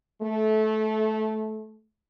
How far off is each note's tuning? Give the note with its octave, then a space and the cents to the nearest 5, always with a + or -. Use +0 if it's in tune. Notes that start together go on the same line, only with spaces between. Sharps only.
A3 -20